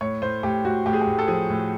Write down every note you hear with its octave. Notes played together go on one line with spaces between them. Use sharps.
A2 C#5
A2 C5
A2 G4
A2 F#4
A2 G4
G#4
G4
A2
A4
F3 G#4
A2